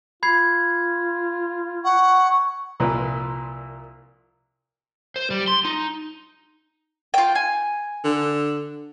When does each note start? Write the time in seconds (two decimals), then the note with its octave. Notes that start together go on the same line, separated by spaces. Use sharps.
0.23 F4 B5 G#6 C7
1.84 F#5 C#6
2.80 C2 A#2 F3 B4
5.16 C5
5.30 G3
5.48 C6
5.65 D#4
7.14 F4 G5
7.35 G#5
8.04 D3